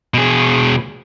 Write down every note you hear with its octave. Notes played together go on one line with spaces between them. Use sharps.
B2 G#4